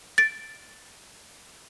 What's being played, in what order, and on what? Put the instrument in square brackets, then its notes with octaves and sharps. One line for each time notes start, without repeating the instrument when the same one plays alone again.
[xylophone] A6 D7